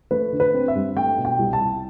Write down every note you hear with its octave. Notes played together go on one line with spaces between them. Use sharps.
A3 B4
D3
B4
C4
E5
G2
A3 G5
B2
G5
C2
A5
C2